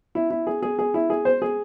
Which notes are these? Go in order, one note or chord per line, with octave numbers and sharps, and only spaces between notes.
E4
E4
G#4
G#4
G#4
E4
G#4
C5
G#4